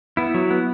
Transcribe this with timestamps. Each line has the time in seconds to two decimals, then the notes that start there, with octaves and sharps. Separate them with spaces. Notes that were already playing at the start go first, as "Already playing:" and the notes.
0.17 B3 E4
0.34 F#3
0.50 B3